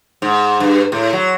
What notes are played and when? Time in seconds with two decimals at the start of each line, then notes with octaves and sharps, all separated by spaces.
0.22 G#2
0.60 G2
0.92 A2
1.13 F#3